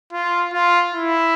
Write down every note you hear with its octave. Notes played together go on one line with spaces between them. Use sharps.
F4
F4
E4